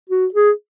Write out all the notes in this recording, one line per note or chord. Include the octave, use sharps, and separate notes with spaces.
F#4
G#4